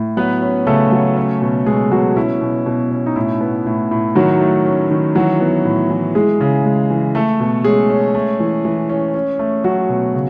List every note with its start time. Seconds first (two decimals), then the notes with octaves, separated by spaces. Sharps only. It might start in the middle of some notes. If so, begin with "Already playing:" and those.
Already playing: A2
0.17 F#3 B3 B4
0.42 C#4
0.67 C#3 A3 A4
0.92 F#3
1.17 C#4
1.42 B2
1.66 B2 G#3 G#4
1.91 B2 F#3 F#4
2.17 C#4 E4
2.41 B2
2.66 B2
2.91 C#4
3.06 D#4
3.16 A2 E4
3.41 B3
3.66 A2
3.91 A2
4.15 D#3 F#3 F#4
4.41 A3
4.66 C#4
4.90 D#3
5.15 E3 F#3 F#4
5.40 B3
5.65 A2
5.90 E3
6.15 E3 G#3 G#4
6.41 C#3
6.65 G#3
6.90 E3
7.15 A3 A4
7.40 B2
7.64 G#3 C#4 G#4
7.90 C#4
8.15 A3
8.40 E3
8.65 E3
8.89 C#4
9.14 C#4
9.39 A3
9.64 F#3 C#4 F#4
9.89 B2
10.14 C#3